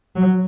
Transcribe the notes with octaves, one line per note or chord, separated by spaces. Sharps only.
F#3